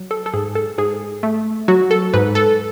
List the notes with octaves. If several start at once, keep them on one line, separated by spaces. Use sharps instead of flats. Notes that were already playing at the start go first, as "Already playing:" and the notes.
Already playing: F#3
A4
A4
G#2 G#4
A4
G#2 G#4
A3
F#3 F#4
A4
G#2 B4
A4